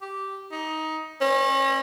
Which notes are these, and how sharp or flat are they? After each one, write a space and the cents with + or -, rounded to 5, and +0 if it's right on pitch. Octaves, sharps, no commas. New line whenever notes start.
G4 -10
D#4 +15
C#4 -35